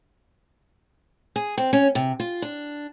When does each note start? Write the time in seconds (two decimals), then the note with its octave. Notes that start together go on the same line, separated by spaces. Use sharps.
1.36 G#4
1.58 C4
1.73 C#4
1.95 C3
2.20 F4
2.42 D4